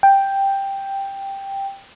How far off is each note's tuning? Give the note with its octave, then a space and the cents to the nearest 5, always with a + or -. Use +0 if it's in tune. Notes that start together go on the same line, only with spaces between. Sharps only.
G5 +5